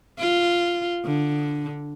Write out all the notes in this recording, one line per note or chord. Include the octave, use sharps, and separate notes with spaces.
F4
D3